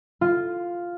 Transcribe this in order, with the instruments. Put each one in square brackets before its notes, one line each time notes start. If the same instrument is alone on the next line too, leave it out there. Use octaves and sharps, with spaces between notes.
[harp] F4